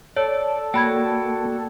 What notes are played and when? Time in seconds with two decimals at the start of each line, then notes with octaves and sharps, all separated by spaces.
0.16 A4 C#5 D5
0.74 A#3 F#4 D5 G5 B5 G#6